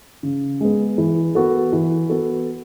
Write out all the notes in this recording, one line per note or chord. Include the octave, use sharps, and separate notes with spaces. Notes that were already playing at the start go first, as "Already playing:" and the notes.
C#3
G#3 B3
E3
B3 F#4 A4
E3
B3 F#4 A4